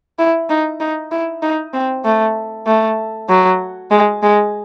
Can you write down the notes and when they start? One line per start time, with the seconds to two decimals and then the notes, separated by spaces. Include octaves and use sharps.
0.19 E4
0.50 D#4
0.80 D#4
1.12 E4
1.43 D#4
1.74 C4
2.05 A3
2.67 A3
3.29 F#3
3.91 G#3
4.23 G#3